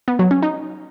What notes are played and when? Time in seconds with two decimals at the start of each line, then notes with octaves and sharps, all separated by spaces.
0.08 B3
0.19 F#3
0.31 C#4
0.42 D#4